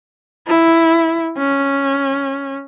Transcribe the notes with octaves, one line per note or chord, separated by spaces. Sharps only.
E4
C#4